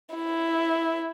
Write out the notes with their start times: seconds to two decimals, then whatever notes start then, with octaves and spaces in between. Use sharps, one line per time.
0.15 E4